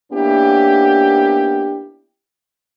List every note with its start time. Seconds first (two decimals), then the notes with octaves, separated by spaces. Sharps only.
0.12 A#3 B3 C#4 D4 E4 G4